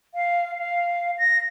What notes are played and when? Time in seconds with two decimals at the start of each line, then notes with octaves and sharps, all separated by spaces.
0.14 F5
0.58 F5
1.18 A#6